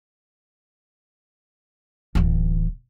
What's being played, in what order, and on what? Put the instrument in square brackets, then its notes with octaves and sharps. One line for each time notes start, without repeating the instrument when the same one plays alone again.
[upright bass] D1 E3